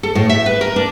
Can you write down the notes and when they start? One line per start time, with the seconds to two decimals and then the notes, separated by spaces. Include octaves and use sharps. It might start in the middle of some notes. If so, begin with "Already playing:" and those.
0.03 A4
0.15 A2
0.29 E5
0.46 B4
0.61 A#4
0.76 D4